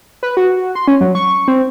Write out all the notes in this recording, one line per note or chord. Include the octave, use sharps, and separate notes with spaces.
B4
F#4
C6
C#4
F#3
C#6
C4